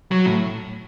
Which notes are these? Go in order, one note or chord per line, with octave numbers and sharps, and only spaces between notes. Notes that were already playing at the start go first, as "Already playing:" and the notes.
F#3
A2